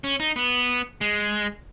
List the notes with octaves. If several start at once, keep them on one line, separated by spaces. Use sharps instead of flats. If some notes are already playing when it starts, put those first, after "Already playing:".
C#4
D#4
B3
G#3